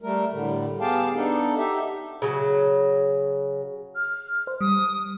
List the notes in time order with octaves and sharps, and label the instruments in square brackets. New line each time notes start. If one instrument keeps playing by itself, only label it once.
[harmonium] G3 A3 A#4
A2 D3 G3
B3 G4 G#4 F5 G5 A5
B3 D4 D#4 A4
D#4 G4 E5
[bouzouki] C#3 F#3
[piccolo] F6
[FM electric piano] C5
[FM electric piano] G3 [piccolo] D#6